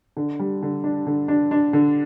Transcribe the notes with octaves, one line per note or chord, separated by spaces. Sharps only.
D3
G3
D3
D4
D3
D4
D4
D3